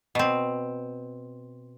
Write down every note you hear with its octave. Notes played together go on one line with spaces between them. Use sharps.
B2 C4